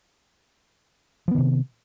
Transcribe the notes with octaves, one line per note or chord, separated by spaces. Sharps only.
C3 D#3 F3 B3